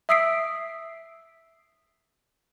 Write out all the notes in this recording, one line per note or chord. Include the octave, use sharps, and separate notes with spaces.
E5 D#6 E6 B6 C7 D7